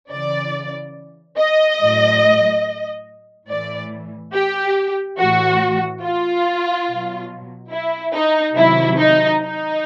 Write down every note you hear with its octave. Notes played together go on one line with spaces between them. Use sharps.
C#3 E3 D5
D#5
A2 F#3
A2 E3 D5
G4
A2 E3 F#4
F4
B2 F#3
E4
D#4
C3 D#3 F#3 E4
D#4
D#4